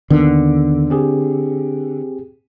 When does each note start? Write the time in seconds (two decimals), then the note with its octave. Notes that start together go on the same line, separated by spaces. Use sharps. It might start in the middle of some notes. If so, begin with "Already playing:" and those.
0.10 D#2 D3 D#3 B3
0.90 C4 G4 G#4